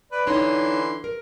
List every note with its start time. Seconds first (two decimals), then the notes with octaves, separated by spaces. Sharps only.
0.12 B4 D5
0.27 D3 E3 D#4 C#5 A5 C6
1.04 A#4